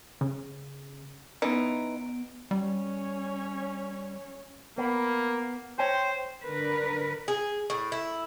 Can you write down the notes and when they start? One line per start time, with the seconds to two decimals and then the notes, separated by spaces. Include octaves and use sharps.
0.21 C#3
1.42 E3 B3 C#4 D#4 D7
2.51 G3 C#4 C#5
4.78 A#3 B3
5.78 C5 C#5 G5
6.43 D3 A#4 B4
7.28 G#4
7.70 A2
7.92 E4